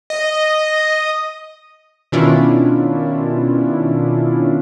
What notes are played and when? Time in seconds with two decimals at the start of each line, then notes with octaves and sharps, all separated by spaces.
0.10 D#5
2.12 B2 D#3 C#4 D4 E4 F4